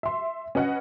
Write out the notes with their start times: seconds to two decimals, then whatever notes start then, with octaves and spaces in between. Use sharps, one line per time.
0.03 E5 C6
0.55 C#4 B4 D#5 F#5